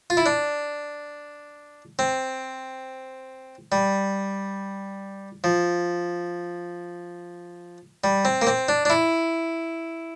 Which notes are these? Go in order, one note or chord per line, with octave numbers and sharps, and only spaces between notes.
F4
E4
D4
C4
G3
F3
G3
C4
A#3
C4
D4
D4
E4